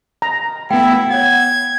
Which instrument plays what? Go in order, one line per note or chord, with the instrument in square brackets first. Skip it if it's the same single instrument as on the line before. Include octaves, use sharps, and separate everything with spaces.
[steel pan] A#5
[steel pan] A3 B3 [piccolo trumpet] E4 [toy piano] G5
[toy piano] C#5 F#5 [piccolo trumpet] G#6